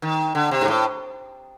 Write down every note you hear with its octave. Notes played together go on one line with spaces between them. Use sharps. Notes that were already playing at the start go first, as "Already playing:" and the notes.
D#3
D3
C3
G#2
A2